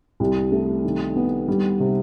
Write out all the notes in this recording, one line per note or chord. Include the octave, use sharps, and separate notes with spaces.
C2
A3
D#3
B3
G3
C3